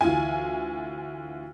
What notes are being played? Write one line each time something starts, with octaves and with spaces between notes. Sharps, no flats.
D2 E3 F4 G#5